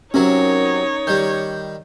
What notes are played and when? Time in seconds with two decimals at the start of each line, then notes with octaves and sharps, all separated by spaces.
0.14 C3 F#3 C#4 D#4 A#4 C#5
1.07 D#3 G3 G6